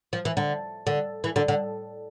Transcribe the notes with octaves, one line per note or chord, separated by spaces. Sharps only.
F3
E3
D3
D3
E3
D3
D3